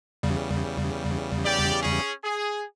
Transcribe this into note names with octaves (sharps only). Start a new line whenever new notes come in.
E2 C#3 G3
G4 D5
C#4 G#4
G#4